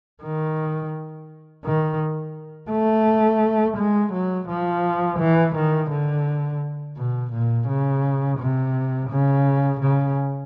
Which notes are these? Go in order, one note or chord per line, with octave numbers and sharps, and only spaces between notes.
D#3
D#3
A3
G#3
F#3
F3
E3
D#3
D3
B2
A#2
C#3
C3
C#3
C#3